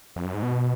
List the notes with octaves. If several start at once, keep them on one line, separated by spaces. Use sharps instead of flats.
F2
F#2
G#2
B2